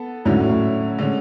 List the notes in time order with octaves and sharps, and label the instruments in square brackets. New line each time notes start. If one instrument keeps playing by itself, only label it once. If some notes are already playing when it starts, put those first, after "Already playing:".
Already playing: [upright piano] B3 A4
[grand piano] G#2 [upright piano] D3 F#3 C#4 E4
[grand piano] A2
A2
[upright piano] D3 G#3 C#4